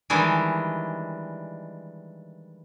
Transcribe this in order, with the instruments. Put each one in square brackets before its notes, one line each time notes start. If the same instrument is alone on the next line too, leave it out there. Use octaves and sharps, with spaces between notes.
[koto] D#3 E3 G3 G#3 D4 E4